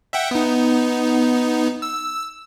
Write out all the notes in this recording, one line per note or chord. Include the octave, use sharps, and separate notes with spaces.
E5 F#5 G5
B3 D#4
E6